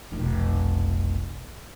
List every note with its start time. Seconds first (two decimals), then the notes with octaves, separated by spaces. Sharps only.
0.12 F1 B1